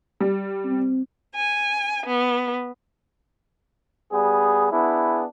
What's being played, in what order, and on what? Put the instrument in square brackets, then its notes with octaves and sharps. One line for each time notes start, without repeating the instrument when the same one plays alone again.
[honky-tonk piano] G3
[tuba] C4
[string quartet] G#5
B3
[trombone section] G3 B3 G#4
B3 D4 E4 G#4